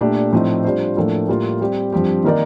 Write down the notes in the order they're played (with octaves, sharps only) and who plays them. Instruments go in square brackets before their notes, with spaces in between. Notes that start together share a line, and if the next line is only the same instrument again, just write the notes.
[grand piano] A#2 A3 D4 G4
A2 F3 A3 C4 D#4
G3 D4 F4 C5
A2 F3 A#3 D4 A4
A2 G3 A#3 F4
G3 C4 G4
G2 F3 C4 G4
D#3 A#3 D#4 A#4 D5